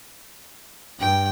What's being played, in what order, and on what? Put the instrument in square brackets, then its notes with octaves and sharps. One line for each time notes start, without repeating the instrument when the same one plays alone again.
[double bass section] G2 [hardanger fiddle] G5